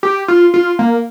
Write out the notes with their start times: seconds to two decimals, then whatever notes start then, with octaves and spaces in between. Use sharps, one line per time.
0.03 G4
0.28 F4
0.54 F4
0.79 A#3